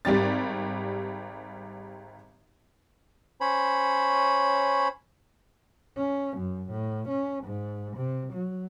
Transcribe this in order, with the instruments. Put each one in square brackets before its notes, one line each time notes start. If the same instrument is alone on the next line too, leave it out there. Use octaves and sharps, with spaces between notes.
[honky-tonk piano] G#1 G3 G4 A6
[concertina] C#4 C5 C#5 B5
[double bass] C#4
F#2
A2
C#4
G#2
C3
F#3